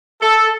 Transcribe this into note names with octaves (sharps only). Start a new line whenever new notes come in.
A4